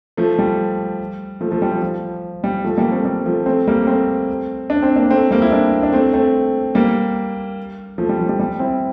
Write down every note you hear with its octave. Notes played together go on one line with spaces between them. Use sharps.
F3 A3
G3
F3 A3
F3 A3
G3
F3
F3
G3
F3 A3
G3 A#3
A3 C4
G3
F3 A3
A3 C4
G3 A#3
A3 C4
D4
C4
A#3 D4
A3 C4
G3 A#3
E4
A#3 D4
D4
A3 C4
A3 C4
G3 A#3
F3 A3
G3
F3
G3
G3
C4 E4